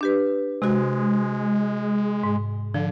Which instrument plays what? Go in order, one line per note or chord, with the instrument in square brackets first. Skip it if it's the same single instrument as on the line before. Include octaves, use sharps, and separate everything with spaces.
[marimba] D4 G4 B4
[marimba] C3 F#4 [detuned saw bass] G#3
[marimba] G#2
[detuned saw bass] D3 [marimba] F3